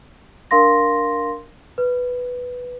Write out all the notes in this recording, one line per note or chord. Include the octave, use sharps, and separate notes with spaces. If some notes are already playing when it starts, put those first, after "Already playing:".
D4 A#4 F5 C6 A#6
B4